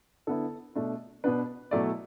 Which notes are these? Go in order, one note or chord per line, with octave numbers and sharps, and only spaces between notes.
D3 B3 E4 A4
B2 A3 D4
B2 B3 D4 B4
B2 F#3 A3 E4 D5